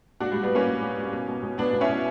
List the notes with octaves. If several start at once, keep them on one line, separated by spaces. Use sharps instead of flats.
A#2 D4 F#4
G3
A#2
G3 B3
A#2 A#3 C#4
A#2
A#2
A#2
B2
B2
B2
B2 B3 D4
B2
C#4 E4
B2